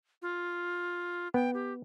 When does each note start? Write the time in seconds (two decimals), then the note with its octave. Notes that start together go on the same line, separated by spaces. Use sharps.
0.22 F4
1.34 B3 G5
1.54 G4